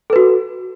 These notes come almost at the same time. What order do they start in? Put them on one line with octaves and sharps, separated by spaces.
A4 B4 F#4